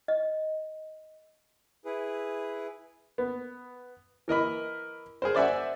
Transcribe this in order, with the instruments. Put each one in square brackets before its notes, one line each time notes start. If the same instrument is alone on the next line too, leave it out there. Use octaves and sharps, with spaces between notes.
[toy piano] D#5
[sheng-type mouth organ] E4 G#4 B4
[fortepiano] B3
E3 A#4 D#5 B5
G#4 A#4 C5
C5 D5 E5 F#5 G#5